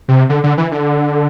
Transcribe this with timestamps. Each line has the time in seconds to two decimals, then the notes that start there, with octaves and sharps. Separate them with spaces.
0.08 C3
0.29 D3
0.44 D3
0.58 E3
0.72 D3